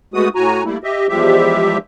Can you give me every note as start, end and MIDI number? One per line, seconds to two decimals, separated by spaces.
0.14 0.29 56
0.14 0.29 57
0.14 0.29 59
0.14 0.29 66
0.14 0.29 87
0.35 0.63 45
0.35 0.63 66
0.35 0.63 80
0.35 0.63 82
0.65 0.78 55
0.65 0.78 57
0.65 0.78 58
0.65 0.78 64
0.83 1.07 67
0.83 1.07 75
0.83 1.07 76
1.09 1.77 40
1.09 1.77 53
1.09 1.77 55
1.09 1.77 56
1.09 1.77 67
1.09 1.77 76